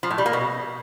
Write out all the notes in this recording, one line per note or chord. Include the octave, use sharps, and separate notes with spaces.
F3
A2
G3
A#3
B2